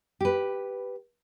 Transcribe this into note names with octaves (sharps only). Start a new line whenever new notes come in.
G4 B4